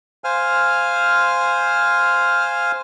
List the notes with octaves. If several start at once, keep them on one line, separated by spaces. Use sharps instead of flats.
C5 F5 G#5 F6